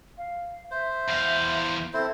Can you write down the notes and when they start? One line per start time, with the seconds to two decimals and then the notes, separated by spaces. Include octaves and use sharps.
0.18 F5
0.71 C5 E5
1.09 E2 F5
1.93 C4 E4 A4 C5